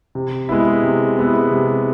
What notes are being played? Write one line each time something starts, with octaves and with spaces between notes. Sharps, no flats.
C3
G#3 B3 E4
C3
G#3 B3 E4
C3